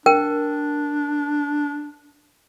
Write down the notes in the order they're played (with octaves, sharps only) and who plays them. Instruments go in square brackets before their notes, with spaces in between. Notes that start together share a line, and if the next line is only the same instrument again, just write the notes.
[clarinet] D4 [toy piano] A#4 G5